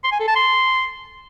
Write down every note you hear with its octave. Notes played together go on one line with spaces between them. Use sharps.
C6
G#5
A4
A5
C6